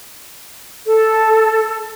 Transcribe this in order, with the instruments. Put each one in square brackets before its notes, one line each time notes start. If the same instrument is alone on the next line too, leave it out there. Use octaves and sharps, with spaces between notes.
[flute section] A4